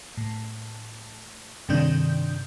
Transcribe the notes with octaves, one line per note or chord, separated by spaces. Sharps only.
A2
G2 C3 D#3 D4 G6